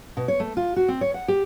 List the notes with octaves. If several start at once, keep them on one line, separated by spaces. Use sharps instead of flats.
B2
C#5
A3
F4
F#4
C4
C#5
F#5
G4